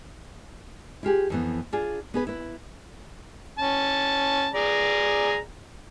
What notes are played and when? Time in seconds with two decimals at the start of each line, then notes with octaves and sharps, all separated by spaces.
1.03 E4 F4 G4 G#4
1.30 F2 E3 B3
1.73 D4 F4 G#4
2.14 B3 G#4 B4
2.27 E4 B4
3.59 C#4 A5
4.54 G#4 D5 A#5